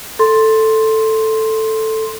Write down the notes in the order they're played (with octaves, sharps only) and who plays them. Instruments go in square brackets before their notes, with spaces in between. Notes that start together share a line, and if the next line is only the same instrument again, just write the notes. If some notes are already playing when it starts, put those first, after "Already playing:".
[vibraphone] A4 C6